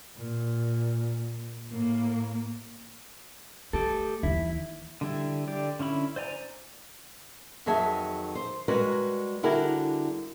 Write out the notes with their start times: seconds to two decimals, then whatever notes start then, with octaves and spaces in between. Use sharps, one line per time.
0.16 A#2
1.70 A2 A#3
3.73 A3 G4 A4
4.23 D#2 E3 E4
5.01 D3 G3 E4
5.48 D3 G4 D5
5.79 D3 C#4 E4 B5
6.16 C5 D5 G#5 A#5
7.66 F2 D#3 F#3 G#4 E5 A5
8.35 C5
8.68 G3 G#3 F#4 A#4 B4 C#5
9.43 D3 G3 E4 F#4 G#4 A#4